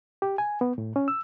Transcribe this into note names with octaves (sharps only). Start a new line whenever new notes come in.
G4
G#5
B3
A2
C#4
E6